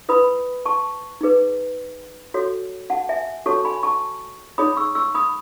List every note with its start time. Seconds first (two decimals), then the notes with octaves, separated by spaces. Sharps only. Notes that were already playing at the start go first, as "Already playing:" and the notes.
0.09 E4 B4 B5 D#6
0.66 A5 C#6
1.21 D#4 G#4 B4
2.34 F#4 A4 C#5
2.90 F#5 A5
3.09 E5 G#5
3.46 F#4 A4 C#5 A5 C#6
3.65 G#5 B5
3.83 A5 C#6
4.58 D#4 G#4 C#5 B5 D#6
4.77 C#6 E6
4.95 C#6 E6
5.15 B5 D#6